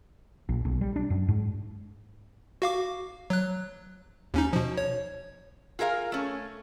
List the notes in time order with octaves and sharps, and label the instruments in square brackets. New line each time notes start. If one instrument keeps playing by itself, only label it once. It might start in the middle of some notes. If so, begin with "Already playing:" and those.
[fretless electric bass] A#1
B1
G3
D4
F#2
G#2
[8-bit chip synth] F#4 F5 D6
F#3 F#6
D#2 C#4 D#4
B2 F3
C#5
[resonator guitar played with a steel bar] F4 G#4 A#4 E5 F5
A3 C#4